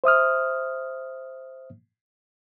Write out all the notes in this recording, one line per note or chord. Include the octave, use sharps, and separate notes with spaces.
C5 E5 D#6 F6